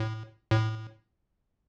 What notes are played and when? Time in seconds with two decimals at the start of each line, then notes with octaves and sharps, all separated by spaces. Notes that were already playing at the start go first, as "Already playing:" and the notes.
Already playing: A2
0.50 A2